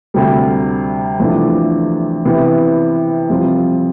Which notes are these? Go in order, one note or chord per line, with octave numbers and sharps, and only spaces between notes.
D2 C3 G3
E2 C3 F3 A3 D4
C3 E3 B3
F2 C3 G3 C4 F4